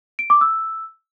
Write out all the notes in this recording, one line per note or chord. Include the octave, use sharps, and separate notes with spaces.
D7
D6
E6